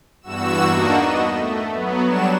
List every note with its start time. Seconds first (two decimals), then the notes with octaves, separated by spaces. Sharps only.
0.22 E2 G2 F#4 E6 E7
0.65 A#3 D4 D#4 F#4
0.94 B3 D#5
1.33 A3
1.73 F#3 B3
2.04 F#3 G3 D4 F#4 E7